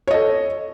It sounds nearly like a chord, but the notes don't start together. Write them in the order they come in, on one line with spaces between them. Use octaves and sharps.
C#5 D#5 A4